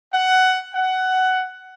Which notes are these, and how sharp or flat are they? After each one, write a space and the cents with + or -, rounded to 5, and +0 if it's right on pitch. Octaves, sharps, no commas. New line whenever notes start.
F#5 +15
F#5 +15